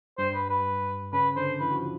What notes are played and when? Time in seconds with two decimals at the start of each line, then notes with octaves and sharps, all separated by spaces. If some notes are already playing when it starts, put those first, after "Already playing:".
0.18 G2 G3 C5
0.34 B4
0.50 B4
1.13 C#3 C#4 B4
1.36 D3 D4 C5
1.60 E3 E4 B4
1.71 F#4
1.76 F3 F4